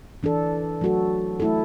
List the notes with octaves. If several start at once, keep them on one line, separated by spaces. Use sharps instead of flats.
E3 D4 A4
F#3 A3 F#4 A4
A3 E4 A4